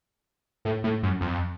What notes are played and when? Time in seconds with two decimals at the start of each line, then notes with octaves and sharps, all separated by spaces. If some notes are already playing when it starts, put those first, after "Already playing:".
0.65 A2
0.84 A2
1.03 F#2
1.21 F2